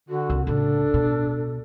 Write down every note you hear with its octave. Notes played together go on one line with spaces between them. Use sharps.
D3 F#4
C2
A2 C#3 D4 A4
B2